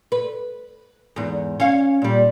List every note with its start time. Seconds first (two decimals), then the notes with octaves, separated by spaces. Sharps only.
0.12 B4
1.16 E2 G#2
1.60 C#4 F5
2.02 A#2 G3